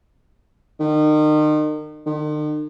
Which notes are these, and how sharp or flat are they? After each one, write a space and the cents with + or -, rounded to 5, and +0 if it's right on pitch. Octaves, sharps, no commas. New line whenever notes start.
D#3 -35
D#3 -45